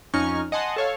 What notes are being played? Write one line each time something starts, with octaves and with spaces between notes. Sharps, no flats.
F2 C#4 D#4 C#6 F6
D#5 F#5 G#5 A5 C6
A4 C#5 F5